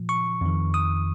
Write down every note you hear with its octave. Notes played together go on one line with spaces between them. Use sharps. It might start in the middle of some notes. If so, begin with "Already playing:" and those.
Already playing: A#2 F3
C#6
F2 D#3
D#6